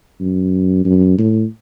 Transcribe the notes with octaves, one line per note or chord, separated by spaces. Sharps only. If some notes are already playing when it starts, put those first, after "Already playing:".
F#2
F#2
A2